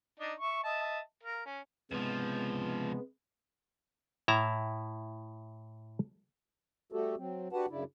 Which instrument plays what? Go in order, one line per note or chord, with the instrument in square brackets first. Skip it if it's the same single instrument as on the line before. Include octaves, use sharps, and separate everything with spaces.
[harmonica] D4 D#4
E5 C#6
D#5 E5 A5
A#4 F5
C#4
[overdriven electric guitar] C#2 F3 [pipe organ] C3 G#3 B3
[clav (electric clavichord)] A2 E4 E5 A5 A#5
[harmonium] G3 A3 F#4 G4 A4
F#3 C4
D4 F#4 G4 B4 F#5 A5
F#2 C#3 D4 E4